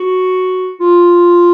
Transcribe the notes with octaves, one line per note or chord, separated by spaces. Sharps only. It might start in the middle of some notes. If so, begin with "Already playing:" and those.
Already playing: F#4
F4